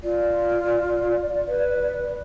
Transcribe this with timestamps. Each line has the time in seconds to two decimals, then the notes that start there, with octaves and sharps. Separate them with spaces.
0.04 F4 D5
1.47 B4